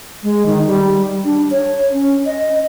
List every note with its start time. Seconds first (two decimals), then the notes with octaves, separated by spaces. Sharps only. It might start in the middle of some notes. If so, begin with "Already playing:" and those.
0.23 G#3
0.46 D#3
0.67 G3
1.25 D4
1.51 C#5
1.92 C#4
2.26 D#5